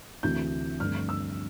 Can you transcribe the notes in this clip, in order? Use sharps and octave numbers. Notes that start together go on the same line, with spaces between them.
D2 C3 E3 G6
G2 D3 F3 A3 C4 F6
E6